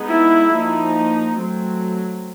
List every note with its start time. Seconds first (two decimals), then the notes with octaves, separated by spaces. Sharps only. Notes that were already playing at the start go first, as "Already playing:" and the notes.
Already playing: G#3 B3 D#4
0.08 E4
0.51 F3 A#3 D#4
1.37 F#3 A3 C4